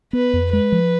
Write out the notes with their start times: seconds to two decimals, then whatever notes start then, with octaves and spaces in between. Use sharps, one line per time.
0.13 B3 B4
0.33 F2
0.52 G#3 B4
0.72 F3